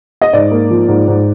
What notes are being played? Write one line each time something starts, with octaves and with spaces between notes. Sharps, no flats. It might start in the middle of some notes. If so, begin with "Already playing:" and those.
D#5
G#2 D5
A#3
F3
G#2
G#2